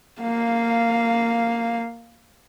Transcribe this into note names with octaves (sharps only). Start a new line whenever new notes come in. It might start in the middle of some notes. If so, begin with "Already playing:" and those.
A#3 F5